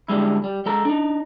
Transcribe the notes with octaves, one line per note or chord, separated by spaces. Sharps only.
D3 G3 G#3 E4
G3
G#3 A4 A#5
D4 D#4